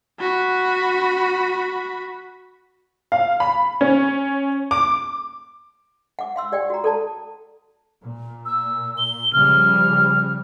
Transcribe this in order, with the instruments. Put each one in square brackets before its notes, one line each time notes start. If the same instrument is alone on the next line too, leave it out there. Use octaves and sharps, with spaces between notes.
[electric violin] F#4 B5
[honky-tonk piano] F5
B5
C#4
D6
[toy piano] F#5 D6
F5 C6 E6
G4 D5 F#5 G5
F#4 A#5
A4 D5 A5 A#5
[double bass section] A#2
[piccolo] E6
G7
[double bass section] C#3 F3 G3 [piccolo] F6